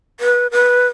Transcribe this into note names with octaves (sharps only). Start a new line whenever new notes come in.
B4
B4